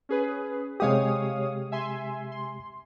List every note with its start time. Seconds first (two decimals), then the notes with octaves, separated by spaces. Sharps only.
0.09 C#4 G#4 B4
0.80 C3 G#3 G4 C#5 F5 D#6
1.72 E5 G#5 C6
2.32 C6